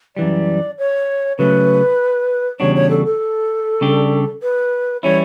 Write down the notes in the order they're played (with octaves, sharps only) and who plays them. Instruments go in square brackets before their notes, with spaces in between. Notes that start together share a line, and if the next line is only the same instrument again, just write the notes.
[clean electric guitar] F#2 E3 G3 [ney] D5
[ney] C#5
[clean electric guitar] C#3 F#3 A3 C#4 [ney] B4
[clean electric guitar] E2 C#3 G3 D4 F#4 [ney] C#5
[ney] C#5
A4
A4
[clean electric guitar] C#3 G3 D4 G4
[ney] B4
[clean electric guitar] E3 G3 C#4 E4 [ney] C#5